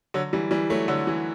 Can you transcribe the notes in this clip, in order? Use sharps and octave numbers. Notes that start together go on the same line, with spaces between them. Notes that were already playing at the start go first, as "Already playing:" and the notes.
D3 F#3
E3 G3
E3 G3
F#3 A3
D3 F#3
E3